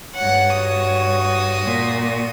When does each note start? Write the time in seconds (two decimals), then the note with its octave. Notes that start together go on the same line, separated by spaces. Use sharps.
0.15 G2 C#5 F#5
0.56 F#4 D#6
1.65 A#2